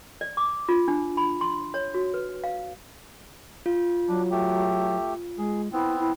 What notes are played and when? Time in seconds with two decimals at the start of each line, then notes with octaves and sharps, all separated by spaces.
0.21 D5
0.37 D6
0.69 F4
0.88 D4
1.17 B5
1.41 C6
1.74 C#5
1.94 F#4
2.14 B4
2.44 F5
3.66 F4
4.08 F#3 D4
4.31 A3 G4
5.38 G#3 G#4
5.73 B3 C4 E4
5.99 E4